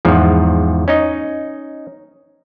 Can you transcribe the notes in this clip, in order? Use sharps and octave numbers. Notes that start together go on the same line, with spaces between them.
E2 G#2 F3
C#4 D#4 D#5